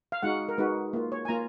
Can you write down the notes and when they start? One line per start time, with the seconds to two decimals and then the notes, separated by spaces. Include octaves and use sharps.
0.12 F5
0.23 G#3 D#4 F#4 F#5
0.49 A#4
0.58 G#3 D#4 F#4 B4
0.93 A#3 F4
1.12 C#5
1.25 G#5
1.28 A#3 F4 A#5